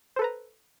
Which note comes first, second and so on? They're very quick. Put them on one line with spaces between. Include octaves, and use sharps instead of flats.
C5 A4 B4 A#5